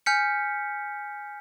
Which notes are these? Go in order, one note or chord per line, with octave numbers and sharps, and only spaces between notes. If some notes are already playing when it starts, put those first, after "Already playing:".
G#5 F6 G6 B6 C#7